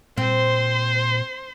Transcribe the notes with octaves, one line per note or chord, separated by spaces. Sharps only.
A#2 C4 C5 C6